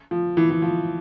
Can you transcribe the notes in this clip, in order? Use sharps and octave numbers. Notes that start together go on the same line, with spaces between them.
F3
E3
E3
F3